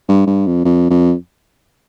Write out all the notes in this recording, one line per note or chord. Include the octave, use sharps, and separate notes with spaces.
G2
G2
F2
F2
F2